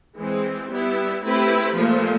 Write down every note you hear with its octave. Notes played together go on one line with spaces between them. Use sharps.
E3 G#3 C4
G3 B3 E4
A3 C4 E4 G4 B4
A#2 F3 A3